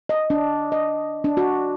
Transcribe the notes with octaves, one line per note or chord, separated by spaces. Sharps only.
D#5
D4
D#5
D4
F#4